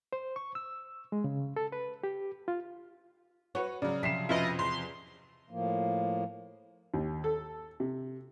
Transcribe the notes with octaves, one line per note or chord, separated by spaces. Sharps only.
C5
C#6
E6
G#3
C#3
A4
B4
G4
F4
F#4 B4 C#5
C#3 F#3 D5
C3 F3 B6 C7 E7
F2 B2 C#4 E4 F4 D#5
E2 C6
A2 F3 A#3
D#2
A4
C3